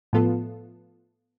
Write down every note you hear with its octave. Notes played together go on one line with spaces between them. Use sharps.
A2 F3 B3 F4 A4